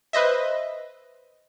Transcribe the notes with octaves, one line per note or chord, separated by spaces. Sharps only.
B4 C5 D#5 E5